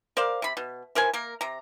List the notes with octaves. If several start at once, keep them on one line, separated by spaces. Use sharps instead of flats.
A#4 C5 D5 F5
C3 B5
B2
E3 A#4 C5 G#5
A#3 A#4
C3 A#5